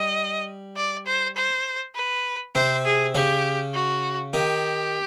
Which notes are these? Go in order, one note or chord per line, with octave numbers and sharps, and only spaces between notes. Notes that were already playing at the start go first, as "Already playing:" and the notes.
Already playing: G3 D#5
D5
C5
C5
B4
C3 C4 C5
G#4
C#3 C#4 G4
F#4
D#3 D#4 G4